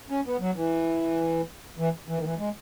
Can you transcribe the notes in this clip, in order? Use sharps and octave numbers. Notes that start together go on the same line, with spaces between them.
C#4
B3
F#3
E3
E3
E3
D#3
E3
G#3